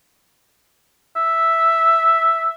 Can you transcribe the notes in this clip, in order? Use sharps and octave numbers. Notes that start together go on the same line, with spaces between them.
E5